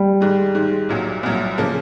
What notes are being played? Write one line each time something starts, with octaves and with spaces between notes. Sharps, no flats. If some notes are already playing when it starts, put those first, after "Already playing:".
Already playing: G3
G#2 D#3 G#3
G#2 D#3 G#3
C2 A#2 F#3
C2 A#2 F#3
C#3 F3 A#3